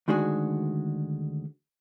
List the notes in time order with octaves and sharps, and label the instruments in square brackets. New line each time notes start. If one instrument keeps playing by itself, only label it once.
[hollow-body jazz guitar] D2 D#3 G#3 D4 F#4 G#4